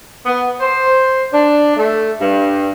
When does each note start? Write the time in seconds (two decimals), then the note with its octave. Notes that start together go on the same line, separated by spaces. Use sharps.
0.25 B3
0.60 C5
1.32 D4
1.76 A3
2.19 G2